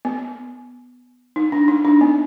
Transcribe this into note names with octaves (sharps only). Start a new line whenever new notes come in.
B3
D#4
D4
D#4
D4
B3